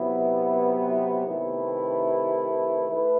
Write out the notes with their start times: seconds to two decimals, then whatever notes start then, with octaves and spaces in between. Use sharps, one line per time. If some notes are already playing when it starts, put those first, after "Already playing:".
Already playing: C3 F#3 B3 E4
1.25 C3 D#3 A3 E4 B4
2.89 A3 E4 B4